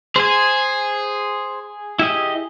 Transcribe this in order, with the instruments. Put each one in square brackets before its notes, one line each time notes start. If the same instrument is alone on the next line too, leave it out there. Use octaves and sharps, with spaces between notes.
[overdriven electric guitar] G#4 [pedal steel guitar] C5 G#5
[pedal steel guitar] E4 G4 D#5